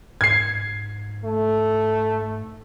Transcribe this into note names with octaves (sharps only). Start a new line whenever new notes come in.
G#2 G#6 C7
A3